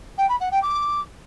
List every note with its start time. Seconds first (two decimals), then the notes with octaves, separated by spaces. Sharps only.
0.18 G5
0.29 B5
0.40 F#5
0.52 G5
0.63 D6